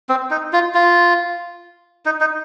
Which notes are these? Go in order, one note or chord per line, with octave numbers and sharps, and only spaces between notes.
C4
D#4
F4
F4
D#4
D#4